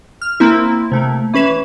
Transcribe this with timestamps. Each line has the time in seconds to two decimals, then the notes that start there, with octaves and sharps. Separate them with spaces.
0.22 F6
0.40 A#3 C4 E4
0.92 C3 A3 A#3
1.34 E3 C#4 B4 E7